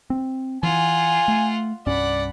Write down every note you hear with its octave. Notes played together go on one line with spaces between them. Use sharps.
C4
E3 F4 F#5 G#5
A3
C2 G2 C#4 D5 F#5 B5